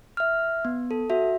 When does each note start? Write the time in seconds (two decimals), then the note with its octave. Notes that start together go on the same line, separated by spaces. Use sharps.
0.17 E5 F6
0.65 B3
0.91 A4
1.10 F#4 E5